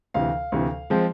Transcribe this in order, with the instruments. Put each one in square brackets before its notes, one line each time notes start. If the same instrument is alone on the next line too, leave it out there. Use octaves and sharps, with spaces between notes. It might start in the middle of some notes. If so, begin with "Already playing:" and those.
[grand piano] D2 C3 E3 F5
D2 C3 E3
F3 G#3 C4